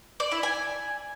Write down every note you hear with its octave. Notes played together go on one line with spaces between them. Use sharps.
D5
E4
G#5